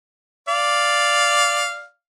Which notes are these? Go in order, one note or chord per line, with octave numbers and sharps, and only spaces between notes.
D5 F5